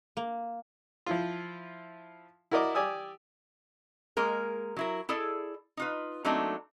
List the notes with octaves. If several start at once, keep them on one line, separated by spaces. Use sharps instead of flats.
A#3
F3 E4 F4
E4 F#4 A#4 D5 D#5 D6
G4 D5 G#5 D#6 E6
G#3 A#3 A#4
F#3 E4 A#4
E4 G#4 A4 D5
D#4 F4 B4
F#3 A3 A#3 C4 D4 D#4